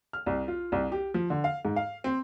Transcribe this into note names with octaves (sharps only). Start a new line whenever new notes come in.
F6
C2
F4
C2
G4
F3
D3
F5
G#2
F5
C4